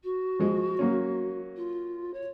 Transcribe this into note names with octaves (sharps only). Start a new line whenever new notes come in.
F#4
F3 G#3
F#3 A#3 C#4
F4
C#5